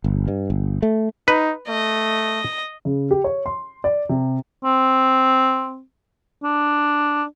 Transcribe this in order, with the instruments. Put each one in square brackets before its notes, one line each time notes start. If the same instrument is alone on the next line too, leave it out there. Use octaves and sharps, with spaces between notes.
[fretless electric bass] G1
G2
G1
A3
[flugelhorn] D#4 [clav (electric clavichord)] B4
[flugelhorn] A3 [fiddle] D#5
[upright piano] C#3
G4
C#5
C6
D5
C3
[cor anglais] C4
D4